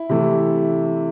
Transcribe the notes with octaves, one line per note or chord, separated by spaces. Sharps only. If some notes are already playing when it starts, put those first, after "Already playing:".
Already playing: E4
C3 E3 A3